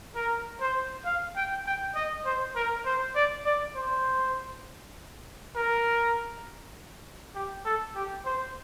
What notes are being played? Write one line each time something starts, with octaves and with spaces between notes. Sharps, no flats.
A#4
C5
F5
G5
G5
D#5
C5
A#4
C5
D5
D5
C5
A#4
G4
A4
G4
C5